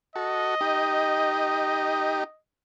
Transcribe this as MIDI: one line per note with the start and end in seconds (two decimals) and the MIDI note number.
0.16 0.55 66
0.16 0.55 69
0.16 2.39 75
0.61 2.24 63
0.61 2.24 67